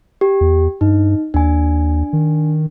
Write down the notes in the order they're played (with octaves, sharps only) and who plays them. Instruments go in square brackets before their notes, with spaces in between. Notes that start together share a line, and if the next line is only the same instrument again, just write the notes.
[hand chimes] G4
[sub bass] E2
[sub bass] G2 [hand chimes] D#4
[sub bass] D#2 [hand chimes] D4 G#5
[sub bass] D#3